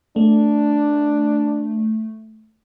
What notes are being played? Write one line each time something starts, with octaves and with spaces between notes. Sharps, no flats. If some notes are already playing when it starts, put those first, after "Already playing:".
A3 D4